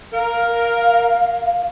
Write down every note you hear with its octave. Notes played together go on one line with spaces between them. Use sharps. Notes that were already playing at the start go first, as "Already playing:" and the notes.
A#4 F5